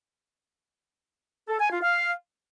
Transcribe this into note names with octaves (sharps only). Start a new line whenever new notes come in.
A4
G#5
F4
F5